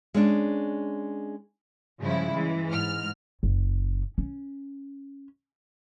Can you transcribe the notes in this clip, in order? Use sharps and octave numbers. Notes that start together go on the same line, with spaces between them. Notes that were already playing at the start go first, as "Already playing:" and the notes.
G#3 C#4 D4
G2 C#3 F3 G#3 E4
E3 G#3
G#2 F6
F#1
C#4